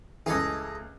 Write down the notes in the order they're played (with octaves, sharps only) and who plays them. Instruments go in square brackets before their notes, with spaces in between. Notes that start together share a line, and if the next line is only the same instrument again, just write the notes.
[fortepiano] C#2 E3 [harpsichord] G#4 A4 D#5